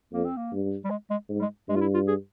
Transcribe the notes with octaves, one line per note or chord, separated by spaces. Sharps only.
F2 A#3
C4
A#3
G2
G3
G#3
G#3
G#2
G3
G#3
G2 G#3
F4
E4
F4
G#4